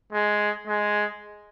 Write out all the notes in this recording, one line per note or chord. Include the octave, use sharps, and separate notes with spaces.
G#3
G#3